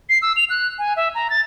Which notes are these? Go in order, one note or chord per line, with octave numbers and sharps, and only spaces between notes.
C7
E6
F7
F#6
G#5
E5
A#5
A6